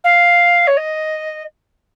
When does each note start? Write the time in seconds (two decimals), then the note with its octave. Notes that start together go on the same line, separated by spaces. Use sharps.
0.04 F5
0.67 C#5
0.77 D#5